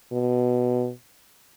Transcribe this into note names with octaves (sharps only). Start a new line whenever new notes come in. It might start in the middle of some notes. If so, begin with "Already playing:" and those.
B2